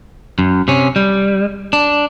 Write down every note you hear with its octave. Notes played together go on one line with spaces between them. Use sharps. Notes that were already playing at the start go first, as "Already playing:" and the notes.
F#2
C3 C#4
G3
D4